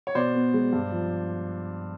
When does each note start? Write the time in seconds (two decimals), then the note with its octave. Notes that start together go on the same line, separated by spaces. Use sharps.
0.07 C#5
0.15 B2 C5 D5
0.35 B3
0.54 G#3
0.72 G2
0.92 F3